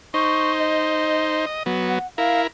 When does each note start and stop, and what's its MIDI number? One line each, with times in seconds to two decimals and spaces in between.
0.14 1.45 63
0.14 1.45 72
0.14 0.53 85
0.59 1.46 75
1.46 1.63 75
1.66 1.99 54
1.66 1.99 59
1.88 2.07 78
2.18 2.47 64
2.18 2.47 70
2.18 2.41 77